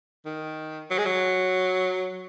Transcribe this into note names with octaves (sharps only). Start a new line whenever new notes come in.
D#3
F#3
G#3
F#3